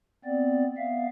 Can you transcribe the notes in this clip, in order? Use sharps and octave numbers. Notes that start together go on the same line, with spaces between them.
B3 C4 D5
B3 E5 F5